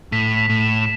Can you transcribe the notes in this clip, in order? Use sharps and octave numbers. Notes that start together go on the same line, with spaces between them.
A2 B6
B6
A2
E7